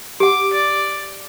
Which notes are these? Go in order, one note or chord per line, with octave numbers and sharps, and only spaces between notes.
G4 F#5 D6
D5